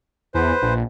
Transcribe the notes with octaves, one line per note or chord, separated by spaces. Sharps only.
E2 B4 C5
A#1